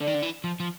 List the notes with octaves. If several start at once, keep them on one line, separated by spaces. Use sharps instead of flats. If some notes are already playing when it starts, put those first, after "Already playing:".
D3 D5
D#3
D3
E3
F3
F3